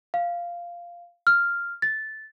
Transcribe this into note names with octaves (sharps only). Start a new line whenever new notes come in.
F5
F6
A6